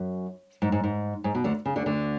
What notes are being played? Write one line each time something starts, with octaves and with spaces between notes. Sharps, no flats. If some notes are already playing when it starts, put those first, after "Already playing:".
Already playing: F#2
G#2
G#2
G#2
G#2
B2
D2 D3
C#3
D2 D3
D2 D3